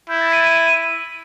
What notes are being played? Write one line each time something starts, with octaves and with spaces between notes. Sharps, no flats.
E4 G6
A6
D#7
D#7